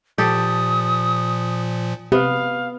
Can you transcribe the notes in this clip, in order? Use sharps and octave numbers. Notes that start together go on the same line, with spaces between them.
A#2 F3 G4 A4 D#6
C3 B3 F5